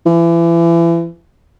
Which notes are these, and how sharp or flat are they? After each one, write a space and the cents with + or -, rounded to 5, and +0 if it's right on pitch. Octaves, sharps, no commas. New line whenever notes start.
E3 +30